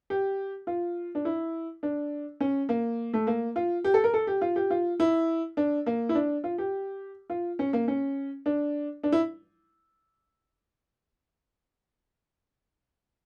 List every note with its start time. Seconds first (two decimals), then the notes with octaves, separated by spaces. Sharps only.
0.10 G4
0.67 F4
1.15 D4
1.25 E4
1.83 D4
2.41 C#4
2.69 A#3
3.14 A3
3.27 A#3
3.56 F4
3.84 G4
3.94 A4
4.04 A#4
4.14 A4
4.27 G4
4.41 F4
4.56 G4
4.70 F4
5.00 E4
5.57 D4
5.86 A#3
6.09 E4
6.15 D4
6.44 F4
6.58 G4
7.30 F4
7.59 C#4
7.73 A#3
7.88 C#4
8.46 D4
9.04 D4
9.12 E4